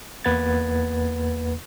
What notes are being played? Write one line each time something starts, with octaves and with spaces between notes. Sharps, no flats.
E2 A#3 B4 F#5 G#6 A6